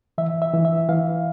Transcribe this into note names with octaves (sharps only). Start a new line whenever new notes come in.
E3 E5
E5
E3
E5
E3 F5